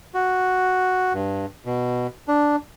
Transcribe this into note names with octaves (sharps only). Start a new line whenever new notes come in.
F#4
G2
B2
D4